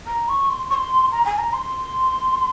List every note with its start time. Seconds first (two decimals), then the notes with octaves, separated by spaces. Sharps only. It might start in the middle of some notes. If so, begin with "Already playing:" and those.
0.06 A#5
0.28 C#6
0.49 C6
0.69 C#6
0.74 C6
1.11 A#5
1.25 G#5
1.38 A#5
1.53 C6